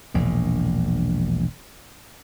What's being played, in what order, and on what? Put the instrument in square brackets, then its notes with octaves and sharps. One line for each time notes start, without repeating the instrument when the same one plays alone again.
[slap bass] E1 A#1 A#2